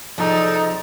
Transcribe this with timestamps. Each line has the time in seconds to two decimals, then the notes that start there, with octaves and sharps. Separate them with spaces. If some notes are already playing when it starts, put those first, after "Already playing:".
0.18 C3 F3 D#4 G#4 A4 D5